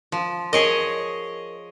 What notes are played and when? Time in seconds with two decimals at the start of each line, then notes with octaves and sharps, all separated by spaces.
0.12 F3
0.53 G#4 A#4 C#5 D#5 D7